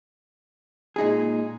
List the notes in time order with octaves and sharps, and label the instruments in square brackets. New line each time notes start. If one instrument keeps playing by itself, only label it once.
[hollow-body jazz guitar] A#2 G#3 D#4 G#4